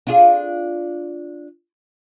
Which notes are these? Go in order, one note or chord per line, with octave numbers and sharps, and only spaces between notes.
D4 F4 G#4